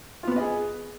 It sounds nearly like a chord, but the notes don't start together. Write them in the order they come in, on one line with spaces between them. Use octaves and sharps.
F4 B3 B4 D#5 G#4